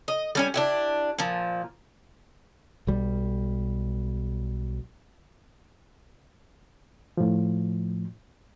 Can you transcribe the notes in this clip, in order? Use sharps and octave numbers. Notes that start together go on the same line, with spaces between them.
D#5
G3 C#4 G#5
D4 E4 G4
A#2 F3
B1 G3
A2 F3